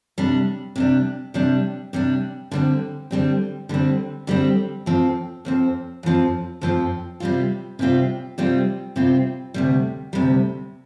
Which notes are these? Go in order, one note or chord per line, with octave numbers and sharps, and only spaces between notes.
C3 G3 D4
C3 G3 D4
C3 G3 D4
C3 G3 D4
D3 G3 C4
D3 G3 C4
D3 G3 C4
D3 G3 C4
F2 F3 C4
F2 F3 C4
F2 F3 C4
F2 F3 C4
C3 G3 C4 F4
C3 G3 C4 F4
C3 G3 C4 F4
C3 G3 C4 F4
D2 C3 G3
D2 C3 G3